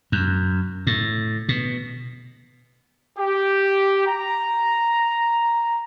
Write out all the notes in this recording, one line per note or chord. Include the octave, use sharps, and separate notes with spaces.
F#2
A2
B2
G4
A#5